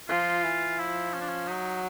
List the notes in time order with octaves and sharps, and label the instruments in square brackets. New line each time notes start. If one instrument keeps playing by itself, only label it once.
[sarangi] F3 [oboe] F4
[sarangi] E3
[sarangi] F3 [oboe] E4
[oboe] C#4
D4
C#4
[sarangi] F#3 [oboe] D#4